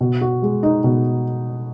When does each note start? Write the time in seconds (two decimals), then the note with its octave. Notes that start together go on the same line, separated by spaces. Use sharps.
0.01 B2
0.21 F#4
0.42 G#3
0.63 D#4
0.84 B2